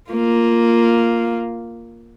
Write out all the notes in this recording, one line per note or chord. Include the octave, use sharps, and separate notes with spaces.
A#3 F4